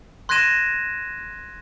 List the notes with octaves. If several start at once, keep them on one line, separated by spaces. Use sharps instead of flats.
C6 F#6 G#6 A#6 D#7 E7